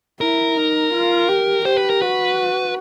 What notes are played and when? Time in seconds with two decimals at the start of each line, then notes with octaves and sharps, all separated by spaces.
0.21 E4 A#4
0.56 D#4
0.93 F4
1.29 G4
1.65 G4 C5
1.77 B4
1.90 A#4
2.02 F#4 B4